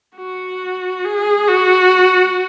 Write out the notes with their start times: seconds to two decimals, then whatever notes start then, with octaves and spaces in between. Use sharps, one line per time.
0.16 F#4
1.05 G#4
1.48 F#4